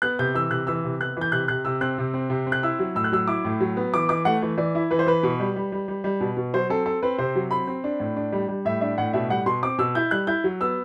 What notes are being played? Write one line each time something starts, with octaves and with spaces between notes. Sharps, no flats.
B3 F#6
C3 G6
E3 E6
C3 F#6
E3 E6
C3
B3 F#6
E3 G6
C3 F#6
C3 F#6
C3 E6
C4 F#6
C3
C4
C3
C4
F#6
E4 E6
F#3
A2 E6
F#6
F#3 E6
E4 D6
A2
F#3
B3
E3 D6
E3 D6
A3 F#5
E3
E3 D5
E4
E3 B4
C5
E3 B4
B2
G3
G3
G3
G3
G3
B2
B2
F#3 C5
C4 A4
C4 A4
C4 B4
C3 C5
F#3
C4 B5
C4
D4
A2
D4
G3
G3
A2 E5
D4 E5
A2 F#5
B2 E5
G3 F#5
B2 C6
C4 D6
B2 E6
E4 G6
G3 F#6
E4 G6
F#3
B3 E6